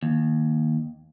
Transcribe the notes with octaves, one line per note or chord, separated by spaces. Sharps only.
D#2